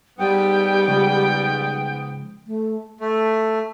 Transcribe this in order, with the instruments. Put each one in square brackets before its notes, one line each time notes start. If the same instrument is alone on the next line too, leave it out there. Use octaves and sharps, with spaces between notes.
[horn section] G#2 B3 [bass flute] G3 [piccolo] G5
[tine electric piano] C#3 F3 G#3
[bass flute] A3
[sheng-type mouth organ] A3